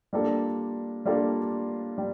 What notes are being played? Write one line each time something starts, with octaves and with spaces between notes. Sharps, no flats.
G3 A#3 D4 F4 A4
G3 A#3 D4 F4 A4
G3